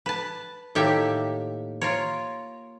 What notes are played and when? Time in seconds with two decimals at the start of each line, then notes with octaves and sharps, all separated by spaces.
0.06 B4 A5
0.75 A2 D#3 A#3 G4 E5
1.81 F4 A#4 C#5